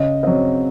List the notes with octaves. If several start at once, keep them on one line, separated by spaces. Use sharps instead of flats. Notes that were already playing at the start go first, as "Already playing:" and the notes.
Already playing: C#3 D#5
F#3 C4 D#5